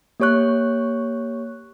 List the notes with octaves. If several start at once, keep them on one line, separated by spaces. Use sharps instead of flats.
A#3 G4 C#5 C#6 F#6